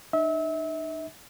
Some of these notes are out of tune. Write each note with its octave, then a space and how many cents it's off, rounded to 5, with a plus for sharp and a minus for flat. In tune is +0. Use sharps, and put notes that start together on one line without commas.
D#4 -40 E5 -35